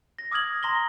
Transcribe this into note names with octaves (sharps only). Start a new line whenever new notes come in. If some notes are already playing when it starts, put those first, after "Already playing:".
A#6
D6 D#6 F6 G#6 F#7
A#5 C6 A#6 G7